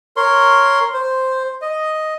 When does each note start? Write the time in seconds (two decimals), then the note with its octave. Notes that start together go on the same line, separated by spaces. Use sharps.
0.17 A#4 C#5 C6
0.94 C5
1.62 D#5